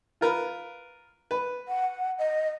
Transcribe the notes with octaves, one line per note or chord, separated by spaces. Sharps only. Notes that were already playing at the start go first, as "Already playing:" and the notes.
F4 A#4 B4
B4
F#5
D#5